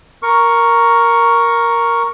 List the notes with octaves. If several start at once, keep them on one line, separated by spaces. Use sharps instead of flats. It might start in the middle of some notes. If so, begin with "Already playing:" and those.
A#4 C#6